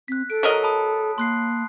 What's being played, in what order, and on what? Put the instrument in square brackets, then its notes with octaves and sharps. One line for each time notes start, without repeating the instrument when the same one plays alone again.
[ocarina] C4 [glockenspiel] F#6 B6
[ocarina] A4 [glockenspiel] D7
[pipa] F#3 A#4 D#5 [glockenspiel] B6
[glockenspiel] A5 B5 D#6
[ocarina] A#3 [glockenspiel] C6 F#6 C7